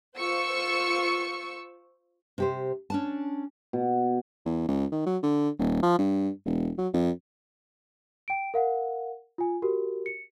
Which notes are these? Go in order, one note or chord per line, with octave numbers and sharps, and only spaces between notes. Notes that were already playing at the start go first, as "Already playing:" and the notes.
F4 C5 C#6 E6 C#7
C3 G4 C5
C#4 D4 A5
B2
E2
C#2
D#3
F#3
D3
D#1
F3
G2
E1
F#3
F2
G5 D7
A#4 F5 F#5
F4 G#5
F#4 G4 A#4
C#7